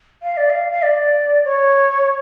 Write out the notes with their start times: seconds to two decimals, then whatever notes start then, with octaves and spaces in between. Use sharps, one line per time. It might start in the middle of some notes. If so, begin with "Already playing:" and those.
0.22 F5
0.37 D5
0.50 F5
0.72 F5
0.83 D5
1.45 C#5